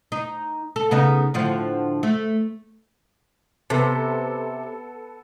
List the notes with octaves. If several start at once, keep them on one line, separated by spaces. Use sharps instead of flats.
D#4
A4
C#3 B3 D#4
A2 D3 F3
A3
C3 B3 A4